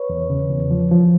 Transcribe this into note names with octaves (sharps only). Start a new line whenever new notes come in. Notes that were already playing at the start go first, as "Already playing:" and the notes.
Already playing: B4 C#5
E2
C#3
E2
F3
F3